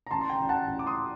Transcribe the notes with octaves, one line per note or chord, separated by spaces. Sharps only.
A#5
A1 A5 C6
C6
G5 A#5
A1
F#5 A5
A1
D6
C6 D#6